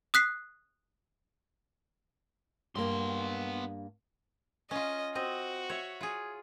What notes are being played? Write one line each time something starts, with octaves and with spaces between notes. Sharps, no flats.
D#6 F#6 B6 C7
G2 A#3 B3 C6
C#4 F4 D#5
C4 F#4 D#5
C#5 E5
F4 G#4